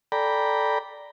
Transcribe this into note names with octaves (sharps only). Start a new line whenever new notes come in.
A4 D5 G5 A#5 B5